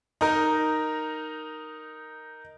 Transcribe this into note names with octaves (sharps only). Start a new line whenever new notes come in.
D#4 A#4